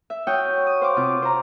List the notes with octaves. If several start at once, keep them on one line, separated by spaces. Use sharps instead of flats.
E5
F#4 C#5 G5 C#6 D#6 F6
D#6
C5 F5 G5 D6
C3 F4
C5 A#5